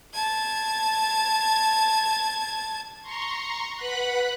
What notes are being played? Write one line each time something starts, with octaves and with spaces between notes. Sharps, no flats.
A5 G#6
A#5 C6 C#6
B4 F#5 B5 F#6